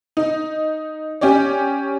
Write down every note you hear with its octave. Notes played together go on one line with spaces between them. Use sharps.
D#4
C#4 G4 C#5 D5